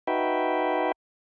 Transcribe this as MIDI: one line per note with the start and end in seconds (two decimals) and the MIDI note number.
0.07 0.92 63
0.07 0.92 66
0.07 0.92 71
0.07 0.92 76
0.07 0.92 79